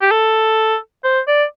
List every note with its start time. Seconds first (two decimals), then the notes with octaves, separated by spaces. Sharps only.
0.02 G4
0.11 A4
1.04 C5
1.28 D5